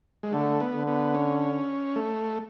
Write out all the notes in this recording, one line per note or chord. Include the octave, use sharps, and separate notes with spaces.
G#3
D3 A3
B3
D3
B3
C#4
A3